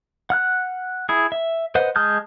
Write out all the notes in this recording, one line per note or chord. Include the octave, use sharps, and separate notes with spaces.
F#5 F6 F#6
E4 G#4
E5
B4 C5 D#5 F#5
G#3 A5 D#6 F6 G6